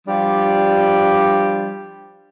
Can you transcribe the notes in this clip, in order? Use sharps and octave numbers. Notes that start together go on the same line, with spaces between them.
F3 G3 D4 G4